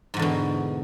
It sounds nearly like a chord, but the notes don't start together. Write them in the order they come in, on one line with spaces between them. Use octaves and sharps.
G#2 E2 D3 B2